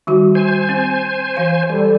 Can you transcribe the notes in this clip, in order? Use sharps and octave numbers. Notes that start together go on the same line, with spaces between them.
D#3 G3 F#4
C5 G#5
C4
E3 F5
G3 A4